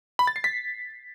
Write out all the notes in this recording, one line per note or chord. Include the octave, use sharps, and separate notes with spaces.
B5
A6
C7
B6